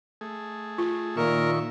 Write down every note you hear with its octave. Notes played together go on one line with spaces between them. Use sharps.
A3 G#4
F4
A#2 D#3 A#4 E5 C#6